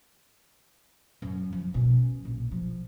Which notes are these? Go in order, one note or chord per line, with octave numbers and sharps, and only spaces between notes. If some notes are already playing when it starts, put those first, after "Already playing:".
F#2
F3
B2 C#4
A#1
F3